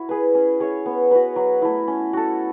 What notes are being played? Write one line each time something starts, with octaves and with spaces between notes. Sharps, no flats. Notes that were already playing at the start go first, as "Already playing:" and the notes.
Already playing: E4 F#4 C#5
G#4 B4
C#4
G#4 C#5 E5
B3
F#4 B4
F#3
A3 E4
C#4
F#4 A4